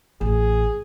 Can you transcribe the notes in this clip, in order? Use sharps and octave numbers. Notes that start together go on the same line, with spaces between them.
A1 G#4